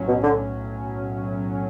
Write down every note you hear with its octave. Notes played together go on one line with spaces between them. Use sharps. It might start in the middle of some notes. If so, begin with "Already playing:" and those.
Already playing: B1 A2 F#3 C#4
B2
D3